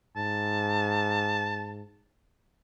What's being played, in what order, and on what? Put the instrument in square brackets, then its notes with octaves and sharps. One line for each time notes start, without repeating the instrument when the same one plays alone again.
[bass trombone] G#2 [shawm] A5